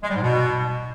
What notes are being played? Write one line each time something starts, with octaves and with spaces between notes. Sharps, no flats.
G#3
G3
G#2
B2